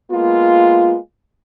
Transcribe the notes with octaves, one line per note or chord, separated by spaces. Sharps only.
G#3 A#3 B3 F4